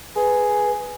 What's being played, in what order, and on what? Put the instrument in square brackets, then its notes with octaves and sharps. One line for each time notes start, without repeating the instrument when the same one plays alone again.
[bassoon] G#4 [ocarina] B4